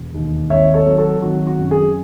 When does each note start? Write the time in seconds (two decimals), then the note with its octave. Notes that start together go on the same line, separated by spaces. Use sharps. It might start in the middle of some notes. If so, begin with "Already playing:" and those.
Already playing: E1
0.14 D#2
0.50 G#1 C#5 E5
0.74 A4 C#5
0.87 F#3
0.98 F#4 A4
1.22 G#1 F#4
1.47 F#4
1.59 F#2
1.71 G#4